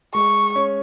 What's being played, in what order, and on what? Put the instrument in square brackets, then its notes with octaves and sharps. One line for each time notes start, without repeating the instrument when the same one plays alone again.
[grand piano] G#3 [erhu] C#6
[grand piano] C#4